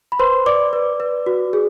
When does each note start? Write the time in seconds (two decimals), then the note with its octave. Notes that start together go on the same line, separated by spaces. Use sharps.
0.12 B5
0.19 B4 C5 C6
0.46 D5 D6
0.73 B4
1.00 B4
1.26 F#4
1.53 G#4